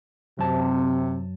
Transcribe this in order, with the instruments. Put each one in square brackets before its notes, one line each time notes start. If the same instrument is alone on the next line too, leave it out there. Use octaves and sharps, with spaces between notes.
[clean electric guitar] F#2 A5 [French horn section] C3